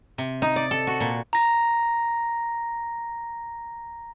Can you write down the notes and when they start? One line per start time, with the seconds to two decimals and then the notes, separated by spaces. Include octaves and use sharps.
0.18 C3
0.42 D#4
0.56 D5
0.71 A4
0.87 F#4
1.00 A#2
1.33 A#5 A#6